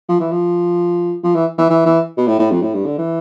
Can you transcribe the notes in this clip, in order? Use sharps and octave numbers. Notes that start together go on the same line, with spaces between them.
F3
E3
F3
F3
E3
E3
E3
E3
B2
A2
A2
F2
A2
G2
D3
E3